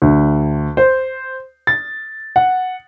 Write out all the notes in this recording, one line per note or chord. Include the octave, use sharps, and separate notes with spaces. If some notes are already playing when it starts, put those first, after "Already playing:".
D2
C5
A6
F#5